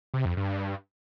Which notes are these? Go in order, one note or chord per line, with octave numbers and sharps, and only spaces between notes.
C3
F2
G2